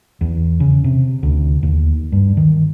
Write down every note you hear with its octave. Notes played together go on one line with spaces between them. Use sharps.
E2
C#3
C3
D2
D#2
G2
D#3